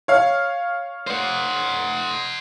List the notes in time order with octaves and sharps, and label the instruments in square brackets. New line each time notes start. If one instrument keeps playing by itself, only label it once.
[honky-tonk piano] C#5 F5
[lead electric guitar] C5 F#5